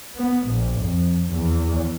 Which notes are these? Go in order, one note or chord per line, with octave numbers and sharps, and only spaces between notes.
B3
A#1
F2
E2